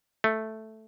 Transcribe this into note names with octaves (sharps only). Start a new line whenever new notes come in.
A3